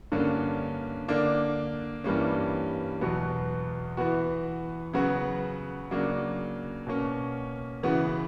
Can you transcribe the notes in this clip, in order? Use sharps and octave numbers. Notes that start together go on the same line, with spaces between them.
G2 D3 A#3 C#4
D3 A#3 D4
G2 E3 G3 A#3 C#4
E2 B2 F#3 B3
E3 B3 F#4
C#3 F#3 B3 F#4
C#3 F#3 A#3 D4
B2 A#3 C#4
C#3 E3 B3 F#4